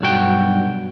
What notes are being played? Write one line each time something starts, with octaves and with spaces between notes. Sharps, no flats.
B1 G2 F#4 G5